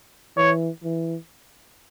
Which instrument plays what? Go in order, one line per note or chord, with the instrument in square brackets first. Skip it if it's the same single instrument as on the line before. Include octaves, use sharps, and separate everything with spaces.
[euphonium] E3 [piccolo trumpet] C#5
[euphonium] E3